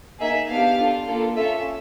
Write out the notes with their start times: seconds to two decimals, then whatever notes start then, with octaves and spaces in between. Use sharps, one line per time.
0.20 A#3 D#4 G#4 E5
0.49 B3 D4 G4 F5
0.78 D4 F4 A4
1.06 A#3 D4 F4 A4
1.36 C#4 F4 A4 E5